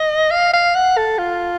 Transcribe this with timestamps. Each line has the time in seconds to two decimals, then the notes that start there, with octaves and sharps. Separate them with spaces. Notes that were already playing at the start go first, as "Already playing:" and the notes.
Already playing: D#5
0.31 F5
0.53 F5
0.75 F#5
0.97 A4
1.18 F4